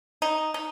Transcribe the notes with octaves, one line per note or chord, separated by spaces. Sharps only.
D#4
D#4